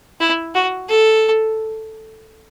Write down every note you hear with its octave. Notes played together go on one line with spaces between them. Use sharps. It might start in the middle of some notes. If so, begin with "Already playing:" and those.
E4
F#4
A4